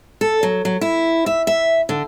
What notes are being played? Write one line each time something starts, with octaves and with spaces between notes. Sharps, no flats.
A4
F#3
F#3
E4
E5
E5
D3